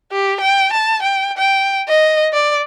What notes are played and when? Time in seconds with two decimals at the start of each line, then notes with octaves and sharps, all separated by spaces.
0.12 G4
0.41 G5
0.73 A5
1.03 G5
1.37 G5
1.88 D#5
2.33 D5